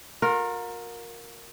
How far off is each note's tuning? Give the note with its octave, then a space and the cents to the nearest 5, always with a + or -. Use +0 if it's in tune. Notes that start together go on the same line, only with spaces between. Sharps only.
F4 +45 A#4 +0